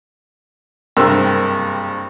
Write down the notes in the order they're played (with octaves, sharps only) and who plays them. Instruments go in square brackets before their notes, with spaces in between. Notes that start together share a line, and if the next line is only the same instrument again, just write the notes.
[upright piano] F#1 G2 C3 A#4 C6 E6